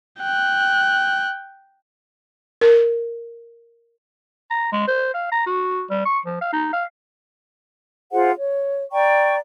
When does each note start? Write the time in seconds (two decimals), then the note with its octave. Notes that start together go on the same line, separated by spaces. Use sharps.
0.19 G5 F#6
2.61 A#4
4.51 A#5
4.73 G#3
4.88 C5
5.14 F5
5.32 A#5
5.46 F#4
5.90 G3
6.06 C#6
6.26 F3
6.41 F5
6.53 D#4
6.73 F5
8.13 F4 G#4 C5 F#5
8.36 C#5
8.92 D5 G5 A#5 C#6